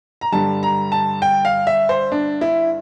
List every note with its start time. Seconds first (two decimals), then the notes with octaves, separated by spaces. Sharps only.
0.21 A#5
0.32 G2 D3 G3 A5
0.63 A#5
0.92 A5
1.22 G5
1.45 F5
1.67 E5
1.89 C5
2.12 D4
2.41 E4